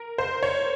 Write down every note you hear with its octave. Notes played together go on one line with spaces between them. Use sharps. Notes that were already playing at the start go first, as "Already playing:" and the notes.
Already playing: A#4
C5
C#5